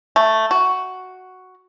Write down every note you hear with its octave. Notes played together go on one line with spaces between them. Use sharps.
A3
F#4